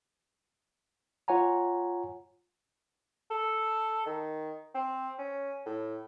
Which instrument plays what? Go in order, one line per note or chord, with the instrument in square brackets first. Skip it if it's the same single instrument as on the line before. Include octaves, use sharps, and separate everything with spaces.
[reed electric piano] F4 C#5 F#5 G#5 A#5
[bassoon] A4
D#3
C4
C#4
A2